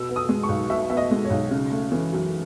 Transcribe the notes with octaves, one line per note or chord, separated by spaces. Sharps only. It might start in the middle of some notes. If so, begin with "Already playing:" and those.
Already playing: B2 E6
B3
D#6
G#3
C#6
B1
B2 E5
B3 E5
D#5
G#3
C#5
B1
C#3
A3
E3
F#2